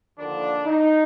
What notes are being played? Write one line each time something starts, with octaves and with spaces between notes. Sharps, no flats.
D#2 D3 F3 D4
D#4